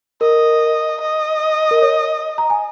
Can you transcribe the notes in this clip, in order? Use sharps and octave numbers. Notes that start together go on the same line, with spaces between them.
A#4 D#5
D#5
A#4
C#5
A#5
G#5